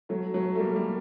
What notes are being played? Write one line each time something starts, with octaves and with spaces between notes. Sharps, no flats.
F#3 A3
F#3 A3
A3
G3 A#3
G3